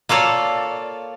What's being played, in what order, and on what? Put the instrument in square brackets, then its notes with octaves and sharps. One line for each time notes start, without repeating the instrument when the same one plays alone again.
[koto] A#3 F4 A4 C#5 D5